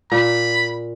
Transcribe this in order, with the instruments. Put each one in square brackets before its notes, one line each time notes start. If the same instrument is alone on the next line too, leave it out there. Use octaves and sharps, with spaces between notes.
[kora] A#2 [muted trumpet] B5